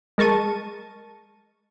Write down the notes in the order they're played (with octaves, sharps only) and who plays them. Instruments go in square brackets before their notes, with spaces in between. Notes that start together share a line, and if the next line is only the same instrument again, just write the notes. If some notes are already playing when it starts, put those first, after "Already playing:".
[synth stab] G#3 A#4 A5 C#6 D#7